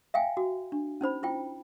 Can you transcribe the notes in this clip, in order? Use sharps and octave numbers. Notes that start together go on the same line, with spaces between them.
E5 F5 G5 G#5
F#4
D4
C#4 D#4 C5 B5
E4 F4 G5